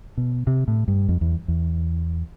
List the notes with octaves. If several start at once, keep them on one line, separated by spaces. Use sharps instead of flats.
B2
C3
A2
G2
F2
E2
E2